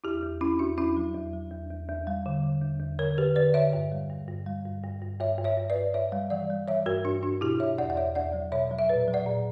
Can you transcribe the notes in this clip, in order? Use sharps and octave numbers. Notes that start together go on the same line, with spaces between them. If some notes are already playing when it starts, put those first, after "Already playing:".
E2 E4 G4
E2
E2 C#4 E4
E2 D4 F#4
E2 C#4 E4
F#3
E2
F#3
E2
E2
E2
G3
D3
D3
E2
E2
D3 A#4 C#5
D3 G4 B4
D3 B4 D5
D3 C#5 E5
G2
G3
G2
G2
G3
G2
G2
G2
G2 C#5 E5
G2
C#5 E5
G2
B4 D5
G2
G2 C#5 E5
G3
E3 D5 F#5
G3
E3 C#5 E5
G2 F#4 A#4
G2 D4 F#4
G2 D4 F#4
B2 E4 G4
B2 C#5 E5
E2 D5 F#5
F#5
E2 C#5 E5
E2 D5 F#5
F#3
B2 C#5 E5
F#3
E5
A#2 B4 D5
F#3
D5 F#5
A#2